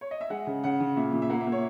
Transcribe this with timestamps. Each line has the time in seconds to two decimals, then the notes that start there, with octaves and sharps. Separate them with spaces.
0.01 C#5
0.11 D#5
0.21 E5
0.30 G#3 F#5
0.47 C#3
0.64 C#3 F#5
0.80 C#3
0.97 A#2 E5
1.13 A#2
1.22 E5
1.30 A#3 F#5
1.41 E5
1.47 A#3
1.52 C#5